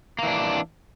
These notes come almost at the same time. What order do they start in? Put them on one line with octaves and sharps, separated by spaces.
A#3 E3 D4